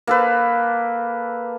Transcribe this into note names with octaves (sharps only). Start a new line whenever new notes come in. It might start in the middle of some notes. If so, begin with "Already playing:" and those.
A#3 A4 B4